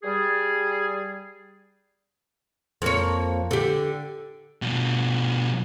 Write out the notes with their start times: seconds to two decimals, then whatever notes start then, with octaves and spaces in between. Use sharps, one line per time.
0.03 G3 G#4
2.82 F2 A#3 C#5
3.51 D3 G4
4.62 B2 F3